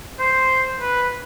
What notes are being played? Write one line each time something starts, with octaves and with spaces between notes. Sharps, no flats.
C5
B4